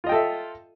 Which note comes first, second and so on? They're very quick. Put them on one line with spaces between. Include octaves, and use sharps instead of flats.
F4 D#5 G5 A4 E5